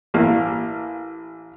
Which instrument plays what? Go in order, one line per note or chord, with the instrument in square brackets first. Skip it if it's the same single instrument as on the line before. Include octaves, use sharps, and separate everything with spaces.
[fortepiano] A1 A#3 F5